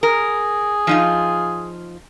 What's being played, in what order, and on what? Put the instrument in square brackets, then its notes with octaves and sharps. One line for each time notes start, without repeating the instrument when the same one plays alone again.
[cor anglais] G#4 [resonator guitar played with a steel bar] A#4
[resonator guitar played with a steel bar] F3 D#4 F4